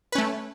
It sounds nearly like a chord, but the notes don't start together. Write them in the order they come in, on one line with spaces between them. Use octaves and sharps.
B4 C#4 A3